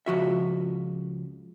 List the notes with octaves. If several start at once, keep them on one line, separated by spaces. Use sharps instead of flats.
C#2 F3 F#4 E5